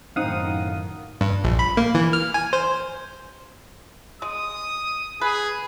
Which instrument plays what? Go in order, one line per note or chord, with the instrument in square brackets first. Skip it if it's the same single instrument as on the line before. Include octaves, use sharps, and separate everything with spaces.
[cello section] F#2 A2 D#3 [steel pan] C4 D#4 [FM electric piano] F5 F#5 D#6
[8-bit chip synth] G2
A#1
B5
A#3
E3
F6
G#5
C5
[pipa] G#3 [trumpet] D#6
[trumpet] G#4 [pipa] B4